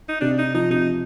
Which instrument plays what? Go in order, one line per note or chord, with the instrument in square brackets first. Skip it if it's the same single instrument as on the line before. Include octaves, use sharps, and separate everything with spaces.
[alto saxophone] D#4
[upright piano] C3 [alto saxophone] D4
[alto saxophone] D#4
[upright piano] F3 [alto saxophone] D#4
[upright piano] C3 [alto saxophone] D#4